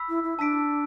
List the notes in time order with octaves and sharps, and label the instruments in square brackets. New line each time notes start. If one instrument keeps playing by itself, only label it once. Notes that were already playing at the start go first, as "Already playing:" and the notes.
Already playing: [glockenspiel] B5 E6 B6
[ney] E4
E4
[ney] D4 [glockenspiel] A5 E6 B6 D7